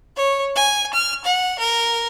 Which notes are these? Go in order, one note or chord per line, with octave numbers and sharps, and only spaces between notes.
C#5
G#5
F6
F#5
A#4